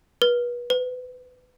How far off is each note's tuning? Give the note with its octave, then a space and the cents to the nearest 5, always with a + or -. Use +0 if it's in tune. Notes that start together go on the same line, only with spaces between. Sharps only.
B4 -35
B4 +30